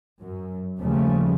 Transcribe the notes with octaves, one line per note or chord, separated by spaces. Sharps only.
F#2
D#2 C#3 F3 G3 A3